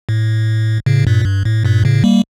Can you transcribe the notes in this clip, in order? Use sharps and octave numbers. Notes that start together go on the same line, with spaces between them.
A2
A2 C#3
G2 A#2
G2
A2
G2 A#2
A2 C#3
G3 A#3